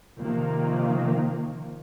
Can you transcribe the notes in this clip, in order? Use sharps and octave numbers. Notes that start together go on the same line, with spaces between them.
C3 D#3 F3 A#3